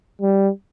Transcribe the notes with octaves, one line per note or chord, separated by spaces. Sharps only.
G3